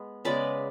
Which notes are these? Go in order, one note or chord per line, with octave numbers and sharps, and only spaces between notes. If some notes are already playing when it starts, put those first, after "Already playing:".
Already playing: G#3 B3
C#3 G#3 B3 B4 D5